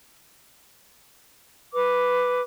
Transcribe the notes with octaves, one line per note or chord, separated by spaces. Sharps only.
B4 D6